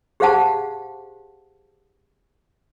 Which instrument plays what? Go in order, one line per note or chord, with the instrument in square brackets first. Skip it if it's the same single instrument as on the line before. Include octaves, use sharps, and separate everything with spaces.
[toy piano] G4 G#4 C5 F5 F#5 A5